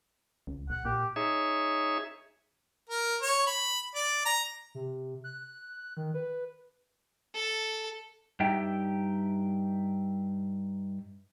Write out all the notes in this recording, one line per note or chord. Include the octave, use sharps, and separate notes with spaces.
C#2
A#1 F#5
A#2 G4
D#4 G#4 C#5 E5
A#4
C#5
B5
D5
A#5
C3
F#6
D#3
B4
A4
G2 D#4 G4 E5 G5